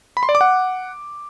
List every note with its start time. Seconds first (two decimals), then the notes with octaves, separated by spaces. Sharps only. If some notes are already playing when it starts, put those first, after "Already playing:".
0.17 B5
0.23 C6
0.29 D5
0.35 D6
0.41 F#5